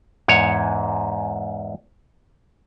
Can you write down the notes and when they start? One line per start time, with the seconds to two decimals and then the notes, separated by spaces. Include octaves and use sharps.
0.28 E2 G#2 C#5